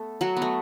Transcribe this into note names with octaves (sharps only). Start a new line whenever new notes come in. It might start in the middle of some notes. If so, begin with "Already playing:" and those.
Already playing: A3 B3 A4
F#3 F#4
B3
A3